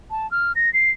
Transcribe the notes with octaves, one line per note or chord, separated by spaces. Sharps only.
A5
F6
A#6
C7